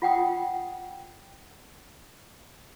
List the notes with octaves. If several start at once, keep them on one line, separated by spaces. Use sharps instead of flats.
F4 F#5 G5 D#6